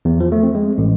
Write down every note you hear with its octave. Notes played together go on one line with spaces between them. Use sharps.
E2
F3
A3
C4
G#3
A1